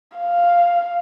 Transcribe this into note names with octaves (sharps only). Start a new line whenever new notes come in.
F5